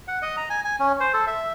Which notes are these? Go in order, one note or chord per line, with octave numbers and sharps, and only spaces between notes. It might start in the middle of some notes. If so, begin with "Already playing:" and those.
F#5
D#5
A#5
G#5
G#5
C#4
C5
A4
E5